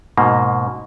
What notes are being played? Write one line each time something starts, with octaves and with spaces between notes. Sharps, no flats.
G#2 B2 A#3